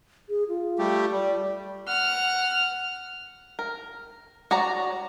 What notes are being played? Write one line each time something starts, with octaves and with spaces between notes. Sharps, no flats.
G#4
F4
G3 A3 G4
G3 D5
F#5 F6
A#4
F#4 C#5 D5 A#5